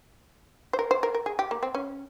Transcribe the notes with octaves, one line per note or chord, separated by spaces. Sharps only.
C5
A#4
C5
A#4
A#4
G#4
G4
A#3
C4
C#4